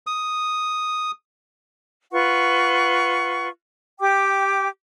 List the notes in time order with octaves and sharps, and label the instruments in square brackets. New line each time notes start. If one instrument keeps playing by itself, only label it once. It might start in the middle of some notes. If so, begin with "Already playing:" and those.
[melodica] D#6
[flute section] F4 B4 F#5 C#6
G4 G5 D6